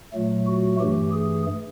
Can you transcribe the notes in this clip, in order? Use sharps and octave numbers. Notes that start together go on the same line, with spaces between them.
A#2 F#3 A3
F#4
G2 E3 A3 G4
G#4